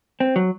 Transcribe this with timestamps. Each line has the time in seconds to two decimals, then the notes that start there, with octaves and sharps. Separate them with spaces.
0.20 C4
0.36 F#3